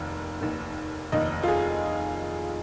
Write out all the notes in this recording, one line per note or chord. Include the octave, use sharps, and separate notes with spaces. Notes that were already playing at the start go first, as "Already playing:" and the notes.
Already playing: F1 D#2 D#3
F1 D#2 D#3
F1 D#2 D#3 D#5
F4
G#4